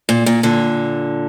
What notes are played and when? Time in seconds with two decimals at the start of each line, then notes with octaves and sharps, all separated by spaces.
0.09 A#2
0.26 A#2
0.43 A#2 D3